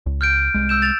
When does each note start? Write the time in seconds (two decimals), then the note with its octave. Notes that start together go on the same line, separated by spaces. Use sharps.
0.06 C#2
0.21 F6 G6 D7
0.54 C2 G#3
0.69 E6 G6 E7
0.82 A6 F7